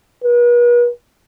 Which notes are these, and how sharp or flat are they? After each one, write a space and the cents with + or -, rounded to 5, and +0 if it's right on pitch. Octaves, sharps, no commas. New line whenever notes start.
B4 -45